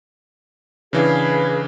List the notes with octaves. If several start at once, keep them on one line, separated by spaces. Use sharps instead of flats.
C#3 E3 D4 G#4 B4 F5